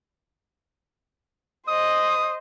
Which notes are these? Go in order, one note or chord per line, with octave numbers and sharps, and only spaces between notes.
C5 D#5 D#6